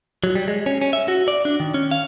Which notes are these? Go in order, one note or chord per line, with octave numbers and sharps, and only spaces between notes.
F#3
G3
G#3
C#4
C#4
E5
F#4
D5
D4
D#3
C#4
F5